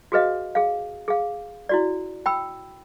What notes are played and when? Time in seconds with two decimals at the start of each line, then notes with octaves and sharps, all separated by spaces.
0.12 F#4 G#4 B4 D#5 F5
0.55 G#4 F5
1.08 G#4 F5
1.69 E4 F#4 D5
2.26 G5 B5 E6